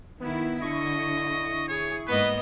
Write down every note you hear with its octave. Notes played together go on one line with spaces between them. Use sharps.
D#3 B3 E4
D3 E4 D#5 C#6
G#4 C#5
G#2 A#3 B3 B4 D#5